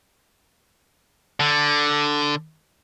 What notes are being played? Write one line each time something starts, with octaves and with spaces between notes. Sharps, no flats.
D3